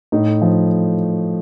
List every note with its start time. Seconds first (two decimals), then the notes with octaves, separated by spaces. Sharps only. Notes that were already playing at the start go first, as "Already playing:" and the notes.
0.12 A2 D#4
0.42 F3